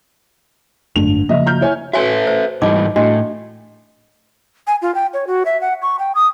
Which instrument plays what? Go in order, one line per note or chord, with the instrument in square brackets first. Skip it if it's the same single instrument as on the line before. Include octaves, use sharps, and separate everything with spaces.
[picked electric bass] G#1 F#2 A3 [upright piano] D3 F7
[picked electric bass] C#3 F3 A#3 [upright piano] D#5 E5
[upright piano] A#5 F6 G6
E4 C#5 G#5
[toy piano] F#4 C#5 G#5 [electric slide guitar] A4 B4 E5
[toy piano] C5
[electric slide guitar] G#2 E3 G3 [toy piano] D#4 D#5 D6
[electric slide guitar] A2 [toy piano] D4 F#4 D#5
[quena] G#5
F4
G5
C#5
F#4
E5
F#5
C#6
G5
D#6